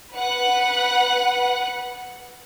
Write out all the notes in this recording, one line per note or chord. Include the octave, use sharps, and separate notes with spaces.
B4 F#5 F#6